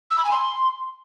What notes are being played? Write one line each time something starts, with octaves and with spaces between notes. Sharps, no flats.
E6
B5
G#5
C6